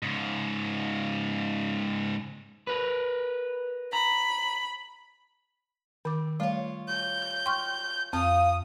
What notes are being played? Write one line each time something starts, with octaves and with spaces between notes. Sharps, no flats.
G#2 C#3
A#4 B4
A#5 B5
D#3 C4 D6
G3 A3 F4 C#5
G6
G5 C6 C#6 F6
F2 A#3 C4 F5 D#6